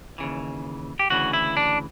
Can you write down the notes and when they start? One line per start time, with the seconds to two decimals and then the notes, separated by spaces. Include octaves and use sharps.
0.18 D#2 C#3 E3
0.99 G4
1.10 D2 C#3 E3 F#4
1.33 E4
1.57 D4